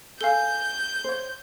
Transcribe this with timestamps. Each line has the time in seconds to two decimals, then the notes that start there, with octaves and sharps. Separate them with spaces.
0.21 A4 F5 G#5 G6 G7
1.04 C5 C#5